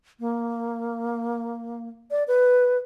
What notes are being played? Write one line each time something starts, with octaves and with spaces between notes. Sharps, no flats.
A#3
D5
B4